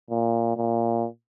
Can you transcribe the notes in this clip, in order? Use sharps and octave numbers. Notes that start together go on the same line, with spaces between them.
A#2
A#2